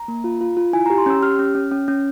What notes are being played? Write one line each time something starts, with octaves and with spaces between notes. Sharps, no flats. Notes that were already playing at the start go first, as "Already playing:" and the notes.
Already playing: A#5
A#3
F4
F4
F4
E4 G#5
G4 A#5
C6
C#4 E6
G4 F6
C#4
C#4
C#4
C#4